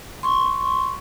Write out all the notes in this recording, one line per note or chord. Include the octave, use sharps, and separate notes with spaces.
C6 C#6